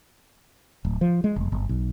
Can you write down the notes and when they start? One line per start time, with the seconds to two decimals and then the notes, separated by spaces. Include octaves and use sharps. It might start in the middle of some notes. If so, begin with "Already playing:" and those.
0.85 D1
1.01 F3
1.24 G#3
1.36 F1
1.52 G1
1.69 B1